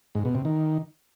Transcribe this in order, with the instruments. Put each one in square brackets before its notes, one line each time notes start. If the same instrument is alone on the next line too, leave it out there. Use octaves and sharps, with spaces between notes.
[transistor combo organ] G#2
B2
C3
D#3